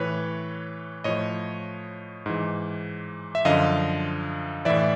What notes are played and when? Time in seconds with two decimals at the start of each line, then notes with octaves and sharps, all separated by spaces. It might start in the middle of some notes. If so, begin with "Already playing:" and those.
Already playing: A2 E3 B4 C#5
1.04 A2 F3 C#5 D#5
2.26 G#2 E3
3.35 E5
3.45 F#2 D3 F3 D#5 F5
4.65 A2 E3 D5 E5